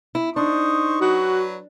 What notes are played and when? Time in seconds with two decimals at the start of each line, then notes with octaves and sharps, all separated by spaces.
0.15 E4
0.36 D4 D#4 C5 C#6 D#6
1.01 F#3 F#4 B4